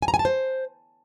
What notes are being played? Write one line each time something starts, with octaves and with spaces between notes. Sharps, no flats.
G#5
A#5
G#5
A5
C5